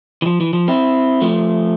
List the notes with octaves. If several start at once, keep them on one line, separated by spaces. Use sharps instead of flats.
E3
F3
E3
F3
C4 E4
F3 A3